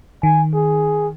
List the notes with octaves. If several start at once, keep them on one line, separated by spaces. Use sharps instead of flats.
D#3 G#5
G#4